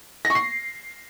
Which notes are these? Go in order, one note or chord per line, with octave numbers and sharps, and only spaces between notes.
A#6
C#6
C7